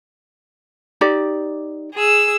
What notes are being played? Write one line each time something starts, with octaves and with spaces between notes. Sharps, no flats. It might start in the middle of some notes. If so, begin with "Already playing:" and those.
D#4 G4 D5
G#4 E6